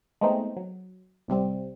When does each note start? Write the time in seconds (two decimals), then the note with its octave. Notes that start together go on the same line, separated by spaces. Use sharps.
0.21 G#3 A3 B3 C4 D#4
0.57 F#3
1.28 A1 C3 G3 C4